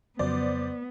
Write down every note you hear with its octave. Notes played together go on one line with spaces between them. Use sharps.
F2 C#3 F#3 B3 C5 D5